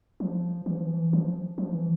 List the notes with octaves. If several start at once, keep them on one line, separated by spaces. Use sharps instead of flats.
F3
E3
F3
E3
F3
F3
E3